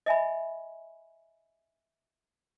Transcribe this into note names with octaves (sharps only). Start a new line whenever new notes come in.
D#5 E5 G#5 B5